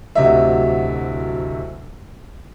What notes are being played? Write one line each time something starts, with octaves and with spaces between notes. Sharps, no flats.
D1 D2 C3 F#3 D#5 E5